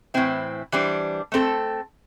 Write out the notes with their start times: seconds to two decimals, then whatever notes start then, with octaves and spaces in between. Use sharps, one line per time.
0.14 A2 E3 C4 E4
0.72 E3 G3 D4 C5
1.32 A3 C4 A4